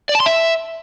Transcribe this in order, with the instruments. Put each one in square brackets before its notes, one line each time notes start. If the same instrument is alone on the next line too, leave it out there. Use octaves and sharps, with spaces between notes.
[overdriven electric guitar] D5
A5
C6
E5